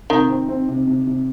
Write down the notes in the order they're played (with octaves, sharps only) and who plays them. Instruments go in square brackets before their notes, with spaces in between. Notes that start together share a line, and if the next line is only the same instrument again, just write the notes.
[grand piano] C3 [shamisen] D#3
[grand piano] C4
C4
C3
C3
C3